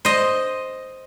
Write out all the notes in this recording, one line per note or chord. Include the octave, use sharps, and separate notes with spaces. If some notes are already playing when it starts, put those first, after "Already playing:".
C5 D#5